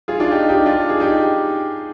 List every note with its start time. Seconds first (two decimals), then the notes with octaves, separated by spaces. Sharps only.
0.08 F4 G#4
0.20 D4 F4
0.31 D#4 G4
0.49 D#4 G4
0.66 D4 F4
0.89 G#4
1.00 D#4 G4